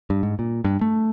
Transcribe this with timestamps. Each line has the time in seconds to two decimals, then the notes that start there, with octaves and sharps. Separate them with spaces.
0.10 G2
0.23 G#2
0.39 A#2
0.64 G2
0.81 A3